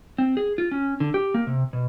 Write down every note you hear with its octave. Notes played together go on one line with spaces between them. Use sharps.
C4
G#4
F4
C#4
D3
G4
A#3
C3
B2